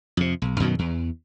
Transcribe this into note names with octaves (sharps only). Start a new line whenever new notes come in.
F2 C3
B1
F#2 B2 D#3 F#3
E2